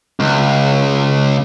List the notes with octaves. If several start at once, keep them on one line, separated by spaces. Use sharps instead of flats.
C#2